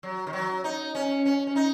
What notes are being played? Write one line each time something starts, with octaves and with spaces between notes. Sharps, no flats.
F#3
D#3
F#3
D#4
C#4
C#4
C#4
D#4